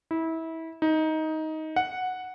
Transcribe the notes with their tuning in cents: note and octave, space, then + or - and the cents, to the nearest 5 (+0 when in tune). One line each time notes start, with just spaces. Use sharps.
E4 -25
D#4 +15
F#5 -5